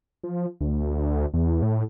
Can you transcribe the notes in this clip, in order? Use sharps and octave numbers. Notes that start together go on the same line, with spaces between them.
F3
D2
E2
A2